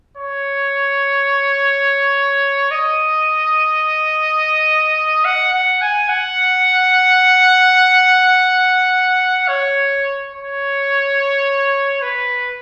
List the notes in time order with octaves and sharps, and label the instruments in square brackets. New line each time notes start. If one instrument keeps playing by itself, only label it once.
[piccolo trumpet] C#5
D#5
F#5
F#5
G#5
F#5
C#5
C#5
B4